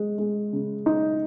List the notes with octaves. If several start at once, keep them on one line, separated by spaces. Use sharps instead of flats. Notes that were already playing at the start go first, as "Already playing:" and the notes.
Already playing: G#3
G#3
C#3
D#4